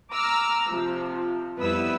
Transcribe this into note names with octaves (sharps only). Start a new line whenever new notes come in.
A#5 D6 E6 F6
C3 F3
F2 G3 B3 E4 B4 E6